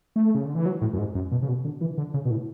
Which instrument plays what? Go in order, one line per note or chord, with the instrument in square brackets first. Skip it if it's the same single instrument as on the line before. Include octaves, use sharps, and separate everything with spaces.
[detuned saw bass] A3
C#3
D3
E3
F#3
A2
F#2
G#2
F#2
B2
C#3
B2
D3
E3
D3
C#3
B2
A2